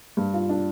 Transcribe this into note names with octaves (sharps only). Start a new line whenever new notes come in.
G2
F4
D4